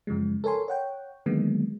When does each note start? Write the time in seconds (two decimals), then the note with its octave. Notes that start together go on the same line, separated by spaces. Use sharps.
0.07 F#2 C#3 F3 G#3
0.44 A4 A#4 C#5 G#5 C6
0.68 C#5 F#5 G5
1.26 D3 D#3 F#3 G#3 A#3 B3